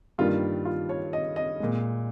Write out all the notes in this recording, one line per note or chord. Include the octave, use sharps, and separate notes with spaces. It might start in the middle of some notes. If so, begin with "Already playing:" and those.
G2 D#3 G3 A#3 F4
F4
C#5
D#5
D#5
A#2 G#3